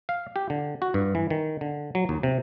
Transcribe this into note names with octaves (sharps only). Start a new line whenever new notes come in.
F5
G4
D3
F#4
G2
E3
D#3
D3
F#3
D#2
C3